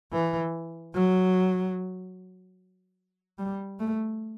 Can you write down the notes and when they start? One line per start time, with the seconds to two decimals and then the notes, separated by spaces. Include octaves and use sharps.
0.13 E3
0.94 F#3
3.38 G3
3.80 A3